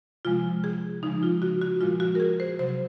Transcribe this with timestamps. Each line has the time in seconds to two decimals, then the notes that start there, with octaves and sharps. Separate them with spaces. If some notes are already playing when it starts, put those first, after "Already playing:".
0.25 C3 F3 G#3 F4
0.64 G#4
1.03 C#3 F3 G#3 D#4
1.23 F4
1.42 F#4
1.62 F#4
1.80 A#2 F3 G#3 F4
2.00 F#4
2.15 A#4
2.20 G#4
2.40 C5
2.59 C3 F#3 C5